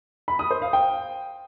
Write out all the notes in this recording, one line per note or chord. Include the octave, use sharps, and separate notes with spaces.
B5
D#6
C5
F5
G5